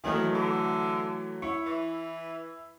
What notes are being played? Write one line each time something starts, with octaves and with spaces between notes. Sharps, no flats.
D#3 E3 F#3 A3
D3
E4 C#5
E3